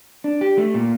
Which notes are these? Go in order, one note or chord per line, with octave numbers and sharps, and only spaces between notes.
D4
G4
A3
A#2